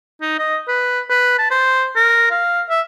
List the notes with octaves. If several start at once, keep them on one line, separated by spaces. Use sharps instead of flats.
D#4
D#5
B4
B4
A5
C5
A#4
F5
E5